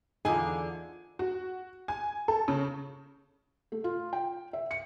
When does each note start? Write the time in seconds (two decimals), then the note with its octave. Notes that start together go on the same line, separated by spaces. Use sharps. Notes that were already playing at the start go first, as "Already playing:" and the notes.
0.25 E2 D3 D#4 F4 G#4 G#5
1.19 F#4
1.88 G#5
2.28 A4
2.48 C#3
3.72 A3
3.84 F4
4.13 G5
4.53 E5
4.71 C#7